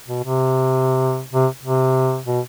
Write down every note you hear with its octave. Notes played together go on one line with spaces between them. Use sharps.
B2
C3
C3
C3
B2